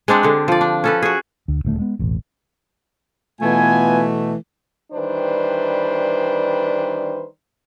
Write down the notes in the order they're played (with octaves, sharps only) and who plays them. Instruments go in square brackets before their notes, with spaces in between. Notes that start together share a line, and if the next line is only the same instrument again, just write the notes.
[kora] G#3 C4 D4 F#5
D3 G4
F3 D5
D4
C#4 A4 B4
F#4 G#4
[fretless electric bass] D2
D#1 D2 A3
G#3 B3
E1 A1
[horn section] B2 E3 A3 [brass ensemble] B3 F4 G#5
[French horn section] D#3 E3 G3 D4 B4 C5